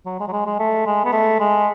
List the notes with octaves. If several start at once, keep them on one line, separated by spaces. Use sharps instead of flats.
F#3
G#3
F#3
G#3
G#3
A3
G#3
B3
A3
G#3